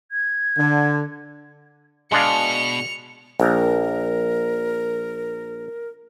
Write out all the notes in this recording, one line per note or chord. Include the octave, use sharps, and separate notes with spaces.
G#6
D3
B2 G#3 D4 F5 C#7 F7
A#1 A#4